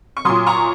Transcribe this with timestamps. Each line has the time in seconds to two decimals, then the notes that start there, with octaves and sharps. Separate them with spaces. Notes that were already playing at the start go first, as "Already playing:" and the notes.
0.17 C#6
0.25 A#2 F#3 C6 D#6
0.47 A#5 C#6